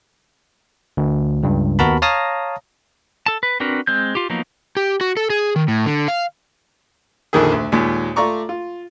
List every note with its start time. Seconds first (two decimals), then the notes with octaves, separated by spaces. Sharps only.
0.97 D2
1.43 C#2 G2
1.79 D#2 B3 F#4 A#4 A5 B5
2.02 C#5 F5 A5 A#5 D#6 A#6
3.26 A4 A5
3.43 B4
3.60 C4 D4 F#4 A#4 B4
3.87 G#3 C4 G6
4.15 F4 G4
4.30 F3 F#3 A#3 B3 D#4
4.77 G4
5.01 F#4
5.17 A4
5.30 G#4
5.56 D#3
5.68 A2
5.86 D3
6.08 F5
7.33 A#1 F2 D3 D#3 A#3 G#4
7.52 D2
7.72 D#2 A#2 G#3
8.16 A3 F4 D5 A#5 C#6 D6
8.49 F4